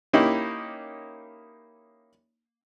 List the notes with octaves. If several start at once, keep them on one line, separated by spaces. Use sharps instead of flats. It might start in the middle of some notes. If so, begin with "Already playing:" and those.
A#3 C#4 D#4 E4 G4